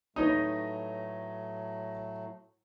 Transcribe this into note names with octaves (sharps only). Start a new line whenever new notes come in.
A2 F#3 A3 D#4 B4 C#5 D#5